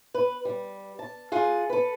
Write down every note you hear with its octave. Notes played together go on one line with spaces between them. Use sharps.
B4
G3
A5
F4 G#4 F#5
A4 B4